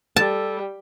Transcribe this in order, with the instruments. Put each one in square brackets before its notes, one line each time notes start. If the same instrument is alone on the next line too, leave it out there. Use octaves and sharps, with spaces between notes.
[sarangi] G3 [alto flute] A4 [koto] A5